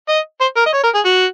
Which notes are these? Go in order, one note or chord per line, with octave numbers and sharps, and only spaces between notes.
D#5
C5
A#4
D#5
C#5
A#4
G#4
F#4